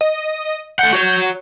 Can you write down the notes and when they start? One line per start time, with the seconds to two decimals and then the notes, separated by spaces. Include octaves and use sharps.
0.01 D#5
0.79 A3 F#5 G6
0.93 F#4 C#5